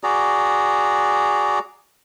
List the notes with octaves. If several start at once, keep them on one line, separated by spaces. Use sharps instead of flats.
F#4 G#4 D5 A#5